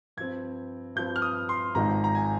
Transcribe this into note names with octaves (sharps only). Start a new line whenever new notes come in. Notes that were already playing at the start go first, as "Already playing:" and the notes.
G2 F3 C4 G#6
G2 F3 C4 G6
F6
D#6
C6
G#1 G#2 F3 G#3 D#4 A#5
A#5
G#5